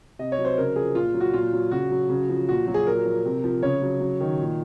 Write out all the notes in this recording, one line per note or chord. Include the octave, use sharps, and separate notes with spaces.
C3 D#5
C#5
F#3
C5
C#3 A#4
F3 G#4
A#2 F4
F#3
F#4
A#2 F4
F#3
C#3 F#4
F#3
C#3
F3
A#2 F#4
F#3
G#4
A#2 A#4
F3
C3
F3
C#3 C#5
F#3
F#3
D#3
A#2